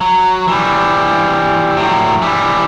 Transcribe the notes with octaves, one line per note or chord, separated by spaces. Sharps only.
F#3
E3 G3
A2 F#3
E3 G3